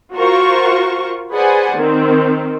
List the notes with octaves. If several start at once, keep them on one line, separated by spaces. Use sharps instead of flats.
F4 F#4 A#4 C5 C#6
G#4 B4 C5 D5 F#5 G#5
D#3 C4